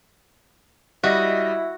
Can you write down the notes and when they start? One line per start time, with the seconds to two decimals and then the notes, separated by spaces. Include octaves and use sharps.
1.03 G3 E4 F#4 D#5 A#6